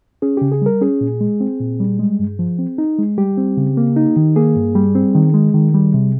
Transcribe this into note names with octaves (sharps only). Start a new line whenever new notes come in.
C#4 G#4
C#3 G4
G#4
G3 A#4
C#4 G#4
A#2
G#3
C4
A#2
G3
G#3
G2
F3
C4
D#4
G#3
G3 G4
C4
C#3
A#3
D#4
D#3
A#3 G#4
G2
G3
C4
D#3
G#3
D#3
G3
C3